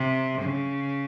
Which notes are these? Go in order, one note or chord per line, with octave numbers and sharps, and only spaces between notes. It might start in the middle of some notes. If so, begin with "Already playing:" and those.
Already playing: C3
C#3